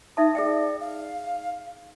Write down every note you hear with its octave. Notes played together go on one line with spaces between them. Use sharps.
D#4 E5 A5 D#6
G#4 D5 E5 G5
F5